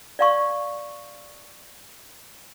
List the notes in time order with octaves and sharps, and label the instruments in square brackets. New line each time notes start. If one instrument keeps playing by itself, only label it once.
[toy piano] D5 F5 C#6